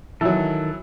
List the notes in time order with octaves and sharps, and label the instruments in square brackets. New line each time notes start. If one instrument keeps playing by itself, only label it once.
[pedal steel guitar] D#3 A4 [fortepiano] E3 F#3